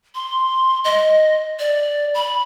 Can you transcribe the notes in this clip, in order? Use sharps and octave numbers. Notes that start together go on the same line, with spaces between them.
C6
D#5
D5
B5